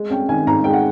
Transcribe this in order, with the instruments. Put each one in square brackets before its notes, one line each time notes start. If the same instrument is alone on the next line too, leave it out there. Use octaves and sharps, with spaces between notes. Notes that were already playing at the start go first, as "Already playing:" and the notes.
Already playing: [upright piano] G#3
C#4 G5
D#3 G#5
G#2 A#5
G#3 G5
F#5